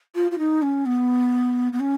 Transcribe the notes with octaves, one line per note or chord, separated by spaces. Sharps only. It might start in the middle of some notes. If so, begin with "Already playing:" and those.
F4
F4
D#4
C#4
B3
B3
C#4